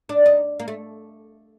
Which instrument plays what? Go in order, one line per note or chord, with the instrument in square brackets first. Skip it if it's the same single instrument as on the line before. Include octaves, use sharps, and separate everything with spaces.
[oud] D4
D#4
A#3
A3